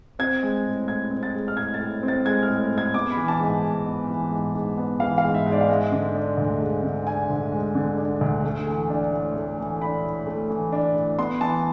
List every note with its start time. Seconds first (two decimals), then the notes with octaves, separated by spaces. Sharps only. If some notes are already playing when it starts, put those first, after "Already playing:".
0.19 C4 G#6
0.43 G#3
0.66 A2
0.88 A2 G#6
1.11 C4
1.23 A6
1.34 G#3
1.48 F6
1.57 A2 G#6
1.74 A6
1.80 A2
2.03 C4
2.08 A6
2.25 G#3 G#6
2.43 F6
2.48 A2
2.71 A2
2.78 G#6
2.94 B3 D6
3.11 B5
3.17 E3
3.28 A5
3.40 G#2
3.45 G#5
3.62 G#2
3.86 B3
4.09 E3
4.31 G#2
4.55 G#2
4.78 B3
5.00 E3 F5
5.18 F5
5.24 G#2
5.35 E5
5.46 G#2
5.52 D5
5.61 F5
5.68 G#3 E5
5.92 D3
6.15 D4
6.38 D2
6.61 G#3
6.83 D3
7.07 D4 G#5
7.30 D2
7.52 G#3
7.75 D3
7.98 D4
8.21 D2
8.44 A3
8.67 E3
8.90 D4
9.12 A2
9.35 A3
9.58 E3
9.81 D4 B5
10.04 A2
10.27 A3
10.49 E3
10.72 D4
10.95 A2
11.18 B3 C6
11.41 E3 A5